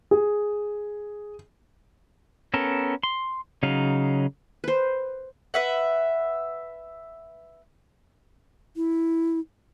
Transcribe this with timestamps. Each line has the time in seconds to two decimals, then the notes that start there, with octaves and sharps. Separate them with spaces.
0.11 G#4
2.54 B3 C#4 A4 A#4
3.03 C6
3.63 C#3 F#3 D#4 F5
4.64 B4 C5
5.54 B4 E5 F#5
8.75 E4